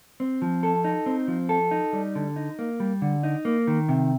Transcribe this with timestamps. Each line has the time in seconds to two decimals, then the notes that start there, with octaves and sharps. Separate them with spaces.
0.20 C4
0.42 F3
0.63 A4
0.84 D#4
1.06 C4
1.28 F3
1.49 A4
1.71 D#4
1.93 G3
2.15 D3
2.36 D#4
2.59 A#3
2.80 G3
3.02 D3
3.23 D#4
3.45 A#3
3.67 D#3
3.89 C3